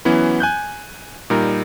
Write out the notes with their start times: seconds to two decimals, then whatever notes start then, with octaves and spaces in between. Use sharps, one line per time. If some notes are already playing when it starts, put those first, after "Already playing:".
0.05 E3 F#3 B3 C#4 E4
0.40 G#5 F#6 G6
1.30 A#2 G3 D#4 A#4